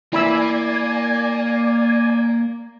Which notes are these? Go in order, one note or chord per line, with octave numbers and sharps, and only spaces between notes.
A#3 E4 D5 G#5 B5 E6